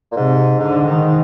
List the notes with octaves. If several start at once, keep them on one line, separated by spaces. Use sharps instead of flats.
A#2
G#2 C3
G#2 D3
D#3